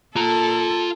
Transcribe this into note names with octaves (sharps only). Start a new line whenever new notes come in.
F4 A4 A#5